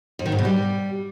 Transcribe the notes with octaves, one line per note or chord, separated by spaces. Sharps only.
F2
D#3
G#2
B2
G3